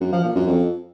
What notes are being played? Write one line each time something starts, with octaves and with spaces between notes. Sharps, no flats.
F#2
F3
A#2
F#2
F2